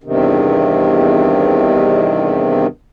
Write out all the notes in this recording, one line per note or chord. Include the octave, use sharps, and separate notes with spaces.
E2 G2 C3 D#3